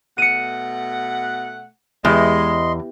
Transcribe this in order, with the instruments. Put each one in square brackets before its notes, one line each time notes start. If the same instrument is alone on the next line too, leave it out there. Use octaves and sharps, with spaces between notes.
[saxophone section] B2 A3 F#5 [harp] C#7 D#7
[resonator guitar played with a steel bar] E2 [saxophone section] G#3 [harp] B3 G4 [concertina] D#5 C6